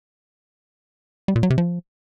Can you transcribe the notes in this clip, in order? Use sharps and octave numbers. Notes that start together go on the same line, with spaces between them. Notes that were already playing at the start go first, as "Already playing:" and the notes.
G3
A#2
F#3
C3
F3